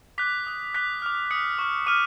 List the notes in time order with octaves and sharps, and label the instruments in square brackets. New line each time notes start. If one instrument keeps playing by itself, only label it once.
[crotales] D6 F#6 B6
D#6 F#6
D6 F#6 B6
D6 F6
D#6 F#6 C#7
C#6 F6
D6 F6 D#7